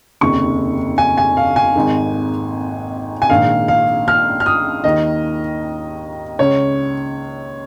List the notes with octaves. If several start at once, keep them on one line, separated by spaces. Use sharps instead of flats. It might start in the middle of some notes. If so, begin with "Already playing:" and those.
F1 D#2 C#3 C#6
G#5
G#5
F5
G#5
G#1 G#2 D#3
G#5
A#1 G#2 D#3 F5
F5
F6
F6
D#6
D#2 D#3 D#5
C#2 C#3 C#5